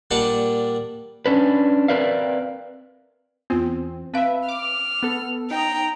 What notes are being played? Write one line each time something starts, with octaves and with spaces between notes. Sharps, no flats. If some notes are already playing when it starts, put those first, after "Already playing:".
A#2 G3 D4 D5 F#5 A5
C#4 D4 B4
C4 A#4 B4 D5 E5 F5
E2 B3 C4 F4
C4 B4 E5 F5
D6 F6
B3 A4
D#4 G5 A#5